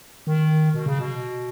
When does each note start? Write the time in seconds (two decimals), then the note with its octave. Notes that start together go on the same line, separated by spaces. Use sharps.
0.27 D#3
0.74 B2
0.86 C#3
0.99 B2